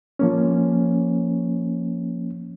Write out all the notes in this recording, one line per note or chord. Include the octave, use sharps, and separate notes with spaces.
F3 A#3 C#4